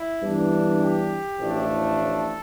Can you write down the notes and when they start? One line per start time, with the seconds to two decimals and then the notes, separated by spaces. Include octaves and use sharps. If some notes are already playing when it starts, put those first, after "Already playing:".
Already playing: E4
0.21 G2 E3 B3 D4
0.80 G4
1.40 A1 A2 F3 A3 D4
2.01 A4